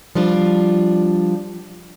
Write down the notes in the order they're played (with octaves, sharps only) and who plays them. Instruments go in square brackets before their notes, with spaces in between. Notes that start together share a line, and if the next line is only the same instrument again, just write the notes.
[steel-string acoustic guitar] F3 G3 D4 F4